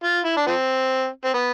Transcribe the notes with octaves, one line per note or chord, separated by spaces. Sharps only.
F4
E4
D4
F3 C4
C4
B3